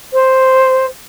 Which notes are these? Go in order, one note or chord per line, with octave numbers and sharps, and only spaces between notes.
C5